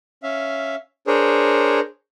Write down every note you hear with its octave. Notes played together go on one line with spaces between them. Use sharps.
C#4 E5 F5
D4 G#4 A#4 C5 C#5